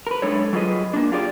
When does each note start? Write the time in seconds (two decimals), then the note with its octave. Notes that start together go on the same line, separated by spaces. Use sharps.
0.07 A#4 B4
0.22 F#2 G#3 A3 D4 A4 C#5
0.53 F#3 F4 G#4 B4 D#5
0.93 A#3 D4
1.12 F4 G4 G#4 D5